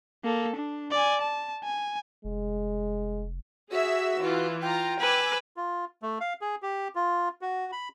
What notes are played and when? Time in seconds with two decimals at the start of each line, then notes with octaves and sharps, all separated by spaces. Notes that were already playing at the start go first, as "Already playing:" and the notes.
0.24 A#3 A4
0.55 D4
0.91 D5 G#5
1.21 A5
1.64 G#5
2.25 F1 G#3
3.71 F#4 G#4 E5 E6
4.19 E3 F4
4.62 F4 G5 A#5
5.00 B4 G#5 D6 E6
5.57 F4
6.02 A3
6.21 F5
6.41 G#4
6.62 G4
6.95 F4
7.41 F#4
7.72 B5